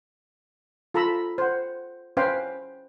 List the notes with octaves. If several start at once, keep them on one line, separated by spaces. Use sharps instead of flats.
F4 A4 A#5 B5 E6
C5 F#5
C#4 B4 C5 F5 G5